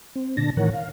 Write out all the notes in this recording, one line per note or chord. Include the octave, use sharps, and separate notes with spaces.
C4
A#2 D3 D4 A5 A#6
A2 D#3 E3 A#4 C#5 F#5
F5